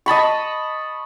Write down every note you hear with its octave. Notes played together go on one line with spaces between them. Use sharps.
D#5 A5 B5 C#6